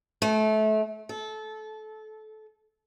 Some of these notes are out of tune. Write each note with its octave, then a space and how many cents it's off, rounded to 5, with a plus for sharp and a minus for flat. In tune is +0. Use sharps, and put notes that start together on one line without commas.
A3 -25
A4 -25